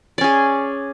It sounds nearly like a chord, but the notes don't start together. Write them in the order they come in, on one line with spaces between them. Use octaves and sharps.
D5 C#4 G#4